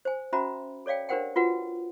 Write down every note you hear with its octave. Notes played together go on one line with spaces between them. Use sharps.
C5 G#5
C#4 F#4 C5 E5 A#5 B5
A4 C#5 D5 F5 G5
D4 G4 A#4 C5 F#5 G5
F4 F#4 B4 F#5